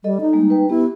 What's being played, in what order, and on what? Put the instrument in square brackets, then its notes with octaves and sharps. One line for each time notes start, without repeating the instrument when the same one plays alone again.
[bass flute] G3 [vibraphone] A4 D#5
[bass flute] D#4
[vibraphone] G3 G#3 A#3
B4 G5
[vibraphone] B3 G4 [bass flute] E4